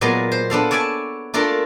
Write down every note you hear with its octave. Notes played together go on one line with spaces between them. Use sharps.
A#2 F#3 G#3 B3 F4
C5
B3 D4 A4 F5
C#5 D5 E5 G#5 A5
A3 D4 F4 A4 A#4